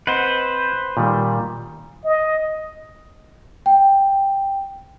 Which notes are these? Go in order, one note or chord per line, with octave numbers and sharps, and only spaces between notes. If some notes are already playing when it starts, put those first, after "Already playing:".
C4 B4 C5 D#5 F#5
A#2 D#3 G3
D#5
G5